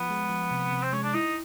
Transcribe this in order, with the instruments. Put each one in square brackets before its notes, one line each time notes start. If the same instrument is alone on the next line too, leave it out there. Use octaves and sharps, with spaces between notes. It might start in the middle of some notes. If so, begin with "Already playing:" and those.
Already playing: [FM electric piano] F3 [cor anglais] B3
[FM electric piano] G#3
F3
C3
C3
[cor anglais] C4
[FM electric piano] G#3 [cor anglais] C#4
[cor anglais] D4
[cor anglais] D#4 [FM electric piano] E4